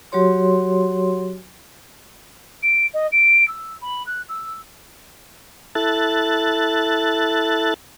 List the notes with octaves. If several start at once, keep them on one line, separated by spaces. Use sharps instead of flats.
F#3 F#4 G4 C#5 C6
D7
D#5
D7
E6
B5
F#6
E6
E4 A4 F#6 A6